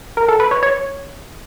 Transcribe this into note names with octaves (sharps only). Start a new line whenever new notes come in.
A#4
A4
B4
C#5
C#5